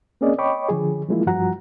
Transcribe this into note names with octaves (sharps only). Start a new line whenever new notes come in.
A#3 C4 C#4 G#4 D5 D#5
C#5 D#5 G5 B5 C#6 D6
D3 F3 G#4
E3 F3 G#3 A#3 E4 F4
G2 F3 F#4 F#5 A#5